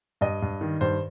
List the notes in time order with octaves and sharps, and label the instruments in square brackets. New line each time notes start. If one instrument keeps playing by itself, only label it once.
[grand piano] G2 D#5
G2
D#3
G2 C5